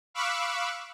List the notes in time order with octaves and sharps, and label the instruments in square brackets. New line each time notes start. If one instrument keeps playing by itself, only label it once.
[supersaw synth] F5 B5 C#6 D6 E6 F#6